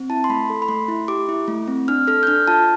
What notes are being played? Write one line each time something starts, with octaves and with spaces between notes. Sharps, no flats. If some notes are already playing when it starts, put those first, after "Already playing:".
Already playing: C4
E4 A5
C6
A3 B5
A4
B5
A3 C6
E4
G4 D6
E4
A3
C4
D4 F6
A4 F6
G6
D4 F6
F4 A5